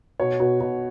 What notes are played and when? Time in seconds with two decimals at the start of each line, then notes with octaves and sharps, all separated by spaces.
0.20 B2 C#5
0.40 B2
0.60 B2